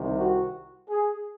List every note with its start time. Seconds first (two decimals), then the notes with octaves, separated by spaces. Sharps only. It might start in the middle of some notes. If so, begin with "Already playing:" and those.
Already playing: C2 C3 D#3
0.17 F#4
0.89 G#4